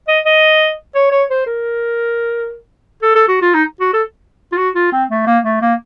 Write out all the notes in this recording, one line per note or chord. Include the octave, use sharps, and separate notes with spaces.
D#5
D#5
C#5
C#5
C5
A#4
A4
A4
F#4
F4
D#4
F#4
A4
F4
F#4
F4
C4
A3
A#3
A3
A#3